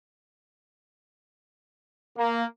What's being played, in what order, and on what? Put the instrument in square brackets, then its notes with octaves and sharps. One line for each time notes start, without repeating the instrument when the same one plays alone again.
[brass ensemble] A#3